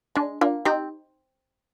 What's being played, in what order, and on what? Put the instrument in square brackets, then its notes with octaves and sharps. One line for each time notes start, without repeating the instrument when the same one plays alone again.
[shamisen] G#3 [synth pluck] D4
[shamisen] A#3 [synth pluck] D4 F4
[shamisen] C4 [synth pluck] D#4 G4